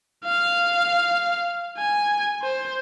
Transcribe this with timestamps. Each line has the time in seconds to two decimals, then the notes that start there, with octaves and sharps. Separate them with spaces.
0.25 F5
1.79 G#5
2.42 C5